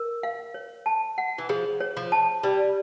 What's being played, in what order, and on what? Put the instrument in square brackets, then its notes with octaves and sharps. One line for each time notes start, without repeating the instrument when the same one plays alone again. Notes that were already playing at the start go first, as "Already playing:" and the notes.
Already playing: [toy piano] A#4
F5
C#5
A5
F#5
[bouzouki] E3
[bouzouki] F3 [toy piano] G#4
[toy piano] C#5
[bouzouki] F3
[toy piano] A5
[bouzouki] G3 [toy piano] D5